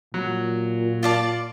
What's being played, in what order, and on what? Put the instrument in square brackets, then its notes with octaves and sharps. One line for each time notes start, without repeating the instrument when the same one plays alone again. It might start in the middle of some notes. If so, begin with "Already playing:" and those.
[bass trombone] A#2 [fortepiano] F#3
[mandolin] F4 D5 A5